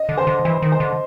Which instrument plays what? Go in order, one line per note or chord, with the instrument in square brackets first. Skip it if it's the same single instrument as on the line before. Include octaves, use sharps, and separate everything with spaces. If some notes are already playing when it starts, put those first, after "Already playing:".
Already playing: [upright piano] D#5
[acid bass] D3
[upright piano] C5
[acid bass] D3
[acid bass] E3 [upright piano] C5
[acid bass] D#3
[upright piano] C5
[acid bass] D3